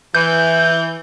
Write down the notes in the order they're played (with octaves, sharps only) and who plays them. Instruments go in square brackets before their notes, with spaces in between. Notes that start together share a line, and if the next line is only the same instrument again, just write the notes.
[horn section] E3 [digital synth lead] G6